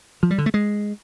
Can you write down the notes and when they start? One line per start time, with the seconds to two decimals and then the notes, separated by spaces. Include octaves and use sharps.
0.23 F3
0.31 G3
0.38 D3
0.46 A3
0.54 G#3